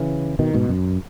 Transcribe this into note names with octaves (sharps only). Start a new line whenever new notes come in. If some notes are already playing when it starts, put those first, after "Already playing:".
Already playing: C#3 E3
B2 D#3
G#2 B2
F#2